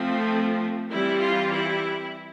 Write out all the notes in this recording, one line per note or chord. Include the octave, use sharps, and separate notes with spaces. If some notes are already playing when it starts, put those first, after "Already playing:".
Already playing: F3 A3 C4
E3 G3 C4 E4
F4
E4